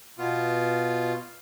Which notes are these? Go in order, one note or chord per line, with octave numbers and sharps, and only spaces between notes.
B2 B3 F4